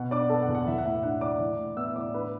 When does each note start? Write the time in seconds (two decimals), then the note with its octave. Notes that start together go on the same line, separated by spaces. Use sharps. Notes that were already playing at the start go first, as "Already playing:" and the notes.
Already playing: B2 F#5
0.11 D4 D5 D6
0.30 B3 A4 A5
0.42 F#5
0.48 E2
0.55 F#5
0.67 E3 E5
0.78 F#5
0.85 A2 E5
1.03 D4 F#5
1.21 A2 D5 D6
1.40 E3
1.59 A2
1.77 B3 E5 E6
1.95 A2 D5 D6
2.14 D3 B4 B5